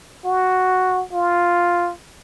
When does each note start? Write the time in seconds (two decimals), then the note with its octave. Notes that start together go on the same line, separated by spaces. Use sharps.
0.25 F#4
1.13 F4